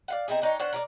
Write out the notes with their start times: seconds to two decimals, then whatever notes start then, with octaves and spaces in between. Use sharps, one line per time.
0.08 D5 F5 F#5
0.28 C4 D#4 E4 G#4
0.42 D4 D#4 C#5
0.60 C#4 D4 C5 F#5
0.73 A#4 C#5 D5